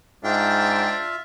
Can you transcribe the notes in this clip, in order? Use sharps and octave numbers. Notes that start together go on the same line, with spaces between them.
G#2 D4 F4 E5 F5 G5